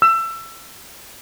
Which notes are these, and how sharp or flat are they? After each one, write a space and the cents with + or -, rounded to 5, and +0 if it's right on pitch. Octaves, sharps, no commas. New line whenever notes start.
E6 +25